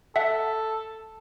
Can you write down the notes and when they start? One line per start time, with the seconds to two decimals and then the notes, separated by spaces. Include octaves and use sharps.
0.16 A4 E5 F#5